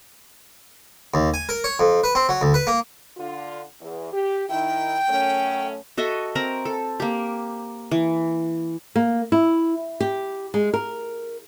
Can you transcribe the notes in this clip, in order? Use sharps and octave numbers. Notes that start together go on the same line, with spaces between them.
D#2
G#5
A#4
C#5
F2
B4
C4
F#3
D2
B4
A#3
D3 F4
E2
G4
D#3 E4 G5
F#2 A3 C#4
F#4 A4 D#5 E5
C4 A#4 A#5
A4
A#3 G4
E3
A#3
E4
G4
G#3
A#4